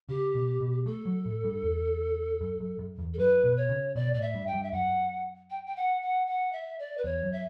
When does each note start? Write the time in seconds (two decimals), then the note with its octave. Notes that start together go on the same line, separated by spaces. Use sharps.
0.09 C#3 G4
0.35 B2
0.61 B2
0.86 A3 A4
1.06 F#3
1.25 A2
1.44 G2
1.63 E2
2.41 F#2
2.60 F#2
2.79 F#2
2.99 E2
3.14 A4
3.18 F#2 B4
3.44 B2
3.57 C#5
3.69 C#3
3.95 B2 D5
4.14 A2 D5
4.21 E5
4.34 G2
4.47 G5
4.53 G2
4.63 E5
4.72 F#2 F#5
5.50 G5
5.66 G5
5.76 F#5
6.02 F#5
6.27 F#5
6.52 E5
6.79 D5
6.97 B4
7.04 E2 C#5
7.23 F#2
7.32 E5